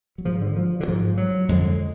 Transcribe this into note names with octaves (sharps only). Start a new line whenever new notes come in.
F#3
G#2 F3
D3
F3
D3
G#2 F3
F#3
F2 D3 G#3